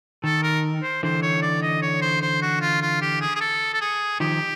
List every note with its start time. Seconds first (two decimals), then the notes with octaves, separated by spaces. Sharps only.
0.24 D#3 A4
0.43 A#4
0.83 C5
1.03 D3 E3 C5
1.22 C#5
1.42 D5
1.62 D#5
1.82 C#5
2.02 C5
2.22 C5
2.42 F#4
2.61 F4
2.82 F4
3.02 G4
3.21 G#4
3.35 G#4
3.41 A4
3.74 A4
3.81 G#4
4.20 D#3 F3 G4